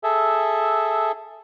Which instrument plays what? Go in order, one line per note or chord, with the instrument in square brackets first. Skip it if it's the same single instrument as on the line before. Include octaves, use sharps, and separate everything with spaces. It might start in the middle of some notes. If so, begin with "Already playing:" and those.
[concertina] G#4 A4 E5